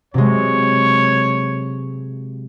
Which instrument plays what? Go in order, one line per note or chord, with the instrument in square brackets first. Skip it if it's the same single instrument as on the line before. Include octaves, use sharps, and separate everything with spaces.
[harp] C3 F#3 G#3 [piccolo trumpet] C#5